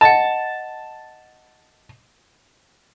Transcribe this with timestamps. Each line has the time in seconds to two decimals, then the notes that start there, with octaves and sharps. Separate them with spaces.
0.01 D#5 F#5 A5